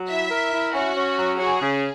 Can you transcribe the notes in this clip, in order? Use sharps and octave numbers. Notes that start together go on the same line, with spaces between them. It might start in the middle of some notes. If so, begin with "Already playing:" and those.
Already playing: F#3
E4 E5
A#4
E4
C#4 F#4
C#4
F#3
F#4 G#4
C#3